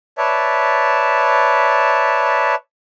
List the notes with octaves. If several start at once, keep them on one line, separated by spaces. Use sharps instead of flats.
B4 C#5 D5 E5 A5